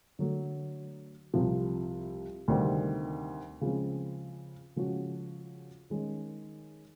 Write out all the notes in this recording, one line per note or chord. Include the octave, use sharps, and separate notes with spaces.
D3 F#3 A3
C2 C3 F3
D2 C3 D#3 G3 C4
C#3 F3 G#3 C4
C#3 F3 G#3 C#4 F#4
D#3 G#3 C#4